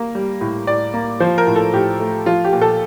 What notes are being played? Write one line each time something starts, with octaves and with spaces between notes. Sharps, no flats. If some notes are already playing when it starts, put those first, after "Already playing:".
Already playing: A#3
G3
A2
A2 D5
A#3
F3 C5
A#4
A2
A4
A2 G4
A3
F3 F4
G4
A#2
A4